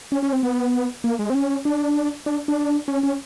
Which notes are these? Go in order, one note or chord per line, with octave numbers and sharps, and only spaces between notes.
C#4
C#4
C4
B3
A#3
G#3
C4
C#4
D4
D4
D4
C#4
C#4